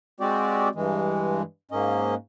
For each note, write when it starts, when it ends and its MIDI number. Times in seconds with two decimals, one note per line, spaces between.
0.20 0.69 56
0.20 0.69 60
0.20 0.69 66
0.20 0.69 67
0.20 0.69 74
0.75 1.42 43
0.75 1.42 52
0.75 1.42 56
1.71 2.15 44
1.71 2.15 58
1.71 2.15 61
1.71 2.15 75